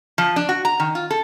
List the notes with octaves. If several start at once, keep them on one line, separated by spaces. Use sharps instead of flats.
F3
D4
F#4
A#5
D#3
F4
A4